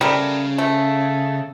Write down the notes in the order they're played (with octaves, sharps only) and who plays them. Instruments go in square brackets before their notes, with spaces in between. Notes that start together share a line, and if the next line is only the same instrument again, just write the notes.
[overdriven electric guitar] C#3 [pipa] G3 A3 A#4
[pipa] A3